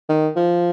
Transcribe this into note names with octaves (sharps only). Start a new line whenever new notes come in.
D#3
F3